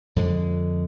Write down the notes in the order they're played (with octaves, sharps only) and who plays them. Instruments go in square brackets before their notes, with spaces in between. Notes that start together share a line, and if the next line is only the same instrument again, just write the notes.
[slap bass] F2 D3 G#3